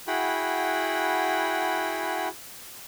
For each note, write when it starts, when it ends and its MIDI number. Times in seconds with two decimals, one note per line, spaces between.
0.07 2.28 64
0.07 2.28 66
0.07 2.28 68
0.07 2.28 78
0.07 2.28 79
0.07 2.28 83